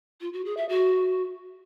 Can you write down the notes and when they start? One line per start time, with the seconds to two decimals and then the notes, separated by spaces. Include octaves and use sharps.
0.21 F4
0.33 F#4
0.45 G#4
0.57 E5
0.69 F#4